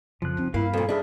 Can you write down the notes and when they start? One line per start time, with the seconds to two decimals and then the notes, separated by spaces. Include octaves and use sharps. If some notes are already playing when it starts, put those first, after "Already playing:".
0.22 F2 C#3 F3 F#6
0.37 C4 C#4 D#4
0.54 G2 A#3 E4 F5 B5
0.73 F2 A#2 A4
0.89 G2 D4 G#4 E5